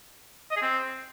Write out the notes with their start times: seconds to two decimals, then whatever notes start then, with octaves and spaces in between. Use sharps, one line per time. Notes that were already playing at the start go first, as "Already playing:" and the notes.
0.51 D#5
0.57 G#4
0.62 C4